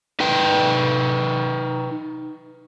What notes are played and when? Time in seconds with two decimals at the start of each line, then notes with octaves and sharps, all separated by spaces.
0.20 D#4 B4 G5